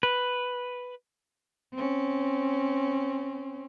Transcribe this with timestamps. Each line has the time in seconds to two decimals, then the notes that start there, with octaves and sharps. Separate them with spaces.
0.03 B4
1.75 C4 C#4